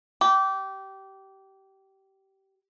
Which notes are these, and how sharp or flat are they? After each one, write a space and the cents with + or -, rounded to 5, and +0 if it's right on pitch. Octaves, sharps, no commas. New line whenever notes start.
G4 -20